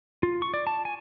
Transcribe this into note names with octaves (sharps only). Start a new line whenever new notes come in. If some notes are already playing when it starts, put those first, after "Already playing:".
F4
C#6
D5
A5
G#5